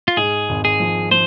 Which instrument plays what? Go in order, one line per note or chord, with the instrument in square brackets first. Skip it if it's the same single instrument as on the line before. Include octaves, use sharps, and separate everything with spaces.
[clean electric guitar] F4
[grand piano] G#2 [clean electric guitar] G#4
[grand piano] G#1
[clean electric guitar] G#4
[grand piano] F3
[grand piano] F3 [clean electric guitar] C5